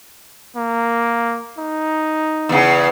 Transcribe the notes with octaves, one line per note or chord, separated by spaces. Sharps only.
A#3
D#4
E2 C#3